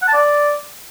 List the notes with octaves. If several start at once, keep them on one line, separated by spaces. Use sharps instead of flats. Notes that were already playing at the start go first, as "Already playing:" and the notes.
F#5
A5
D5